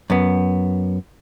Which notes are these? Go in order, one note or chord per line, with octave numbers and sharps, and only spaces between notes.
F#2 B3